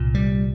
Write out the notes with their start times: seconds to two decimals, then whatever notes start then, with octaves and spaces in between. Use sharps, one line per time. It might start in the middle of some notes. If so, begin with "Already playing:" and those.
Already playing: C2 A#2
0.15 G3